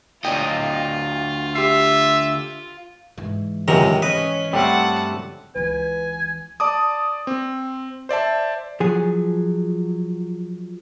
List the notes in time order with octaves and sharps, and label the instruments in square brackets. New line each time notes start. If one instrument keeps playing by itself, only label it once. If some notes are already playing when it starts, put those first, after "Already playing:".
[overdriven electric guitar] D2 D#5 [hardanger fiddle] F4 [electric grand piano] D5 G5
[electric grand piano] G4 C6 C7 [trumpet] E5
[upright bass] G#2 E3
[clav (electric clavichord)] C#2 F#2 [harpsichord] C3 D#3 A#5
[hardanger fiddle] C#4 [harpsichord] B4 [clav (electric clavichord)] D#5
[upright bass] G2 [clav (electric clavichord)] G3 A3 C4 [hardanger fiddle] F#5 A5
[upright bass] C#2 E3 [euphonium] B4 [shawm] G#5
[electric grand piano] D5 A5 D6 D#6
C4
C5 D5 E5 A5
[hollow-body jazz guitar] F3 F#3 G#4